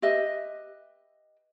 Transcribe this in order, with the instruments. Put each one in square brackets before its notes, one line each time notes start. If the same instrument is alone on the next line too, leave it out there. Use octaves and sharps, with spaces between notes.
[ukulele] G4 B4 D#5 E5